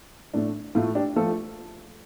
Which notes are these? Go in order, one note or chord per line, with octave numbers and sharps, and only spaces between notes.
A2 A3 D4
A2 A3 F4
D4 G4
F3 A3 F4 A4